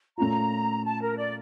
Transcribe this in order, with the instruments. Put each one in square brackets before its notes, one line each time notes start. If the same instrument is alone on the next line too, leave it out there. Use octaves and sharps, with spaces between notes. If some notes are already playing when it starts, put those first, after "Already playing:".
[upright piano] A#2 A3 C#4 F4 [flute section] A#5
[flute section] A5
A#4
D5